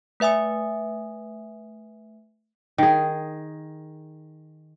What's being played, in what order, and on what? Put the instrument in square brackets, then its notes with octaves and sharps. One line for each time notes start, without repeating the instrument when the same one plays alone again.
[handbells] A3 B4 E5 G#5 D#6
[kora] D#3 G#4